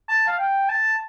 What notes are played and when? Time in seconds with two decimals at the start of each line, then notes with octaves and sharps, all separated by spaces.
0.09 A5
0.28 F5
0.39 G5
0.69 A5